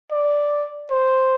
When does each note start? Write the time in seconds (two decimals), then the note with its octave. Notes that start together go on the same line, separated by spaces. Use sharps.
0.11 D5
0.91 C5